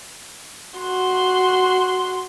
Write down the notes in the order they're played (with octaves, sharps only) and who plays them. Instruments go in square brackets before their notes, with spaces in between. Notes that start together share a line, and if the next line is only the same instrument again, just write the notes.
[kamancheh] F#4 C6